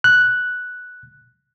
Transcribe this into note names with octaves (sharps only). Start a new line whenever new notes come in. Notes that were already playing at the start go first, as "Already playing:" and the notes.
F#6